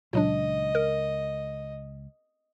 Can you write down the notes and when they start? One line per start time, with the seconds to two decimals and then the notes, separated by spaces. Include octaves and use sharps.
0.13 C#2 A#2 F#3 D4 D#5
0.75 A#4